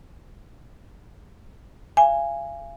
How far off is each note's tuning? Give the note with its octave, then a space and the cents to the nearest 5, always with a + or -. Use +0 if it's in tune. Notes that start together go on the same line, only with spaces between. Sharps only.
F5 -40 G#5 -10